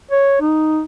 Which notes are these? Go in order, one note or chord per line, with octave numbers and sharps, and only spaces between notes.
C#5
D#4